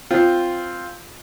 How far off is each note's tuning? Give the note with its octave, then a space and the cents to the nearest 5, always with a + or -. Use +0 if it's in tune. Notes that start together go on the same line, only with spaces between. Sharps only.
C4 +0 F4 +0